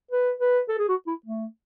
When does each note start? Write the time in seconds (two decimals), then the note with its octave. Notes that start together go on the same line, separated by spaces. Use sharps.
0.11 B4
0.40 B4
0.69 A4
0.79 G#4
0.88 F#4
1.07 E4
1.26 A3